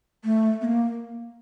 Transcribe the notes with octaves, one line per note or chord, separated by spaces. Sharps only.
A3
B3
A#3